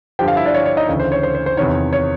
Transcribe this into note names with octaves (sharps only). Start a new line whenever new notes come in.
G2 D3 F3 G4 G5
F4 F5
E4 E5
D4 D5
C#5
C#5
D#4 D#5
D2 C#3 E3
C5
C#5
C5
C5
C5
E2 C3 D#3 C#5
C#5